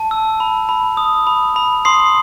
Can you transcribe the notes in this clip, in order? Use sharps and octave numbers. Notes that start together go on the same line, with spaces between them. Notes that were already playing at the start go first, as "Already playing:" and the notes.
Already playing: A5
E6
B5
B5
D#6
B5
B5
C6 D#6 C7